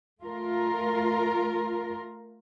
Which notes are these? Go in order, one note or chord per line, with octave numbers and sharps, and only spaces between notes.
A3 F4 A#4